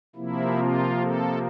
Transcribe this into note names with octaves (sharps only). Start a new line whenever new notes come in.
C3 F3 A#3 E4
F4
A4